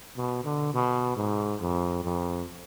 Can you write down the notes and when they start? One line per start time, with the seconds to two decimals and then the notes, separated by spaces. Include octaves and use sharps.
0.17 B2
0.45 D3
0.74 B2
1.17 G#2
1.61 F2
2.04 F2